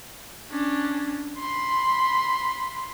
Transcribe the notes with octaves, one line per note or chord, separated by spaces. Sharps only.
C#4 D4
B5 C6